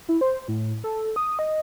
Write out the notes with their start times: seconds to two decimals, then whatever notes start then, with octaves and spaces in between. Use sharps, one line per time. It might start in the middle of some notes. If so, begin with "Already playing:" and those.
0.09 E4
0.21 C5
0.48 A2
0.84 A4
1.16 D#6
1.39 D#5